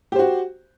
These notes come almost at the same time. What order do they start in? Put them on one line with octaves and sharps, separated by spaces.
G4 C5 F#4